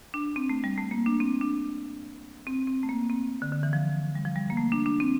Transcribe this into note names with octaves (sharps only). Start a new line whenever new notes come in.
D4
C4
A3
G3
A3
A#3
D4
C4
D4
C4
C4
A3
A#3
C4
D3
D3
E3
F3
G3
F3
G3
A#3
A3
D4
D4
C4